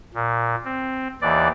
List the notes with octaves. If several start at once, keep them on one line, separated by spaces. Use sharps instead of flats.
A#2
C4
D#2 E3 D5